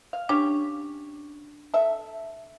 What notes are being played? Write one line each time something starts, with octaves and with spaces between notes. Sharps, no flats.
F5
C#4 D4 G4 C#5
A4 E5